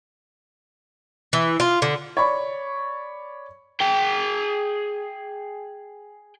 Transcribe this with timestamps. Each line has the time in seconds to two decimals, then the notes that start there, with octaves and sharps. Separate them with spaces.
1.33 E3
1.60 F4
1.82 D3
2.17 C#5 D5 B5 C#6
3.81 G#4 G5